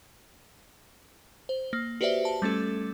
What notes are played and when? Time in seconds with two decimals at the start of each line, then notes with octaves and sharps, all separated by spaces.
1.49 C5
1.73 A#3
2.01 F#4 G4 B4 C5 D5 E5
2.25 A5
2.42 G3 A3 C#4 A4